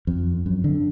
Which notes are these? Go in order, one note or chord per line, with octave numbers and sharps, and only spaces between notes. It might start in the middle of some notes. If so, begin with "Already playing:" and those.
F2
F#2
D3